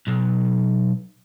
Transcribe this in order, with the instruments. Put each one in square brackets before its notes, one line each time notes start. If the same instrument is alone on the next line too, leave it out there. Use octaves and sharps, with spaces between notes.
[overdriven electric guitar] B1